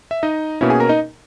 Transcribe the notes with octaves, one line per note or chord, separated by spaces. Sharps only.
E5
D#4 D#5
B2 A#3 C#4 E4 E5
G#4 G#5
A#4 A#5
D#4 D#5